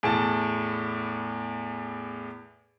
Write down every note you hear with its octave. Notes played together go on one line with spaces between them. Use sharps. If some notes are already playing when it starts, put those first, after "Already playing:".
E2 A2 A5